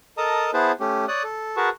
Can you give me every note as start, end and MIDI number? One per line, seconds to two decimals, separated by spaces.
0.18 0.51 69
0.18 0.51 70
0.18 0.51 75
0.18 0.51 81
0.18 0.51 82
0.18 0.51 87
0.54 0.72 59
0.54 0.72 64
0.54 0.72 68
0.54 0.72 71
0.54 0.72 72
0.54 0.72 81
0.80 1.05 57
0.80 1.05 61
0.80 1.05 67
1.08 1.23 73
1.08 1.23 74
1.08 1.23 87
1.08 1.23 90
1.24 1.56 69
1.57 1.69 66
1.57 1.69 68
1.57 1.69 70
1.57 1.69 71
1.57 1.69 81
1.57 1.69 85